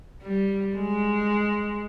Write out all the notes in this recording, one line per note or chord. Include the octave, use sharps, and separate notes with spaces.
G3
G#3